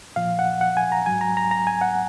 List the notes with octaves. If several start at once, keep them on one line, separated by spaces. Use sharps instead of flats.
A#2 F3 F5
F#5
F#5
G#5
A#5
G#2 F#3 G#5
A#5
A#5
A#5
G#5
F#5